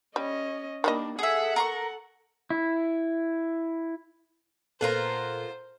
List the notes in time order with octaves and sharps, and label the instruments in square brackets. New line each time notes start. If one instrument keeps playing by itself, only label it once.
[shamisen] G3 [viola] C#4 D#5
[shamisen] D#3 G3 D#5 [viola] A#3 D4
[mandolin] G#4 E5 [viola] A4 F#5
[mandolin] A#4 C6 C#6
[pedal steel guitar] E4
[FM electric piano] A#2 A4 [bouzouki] B3 F4 A#4 [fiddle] C5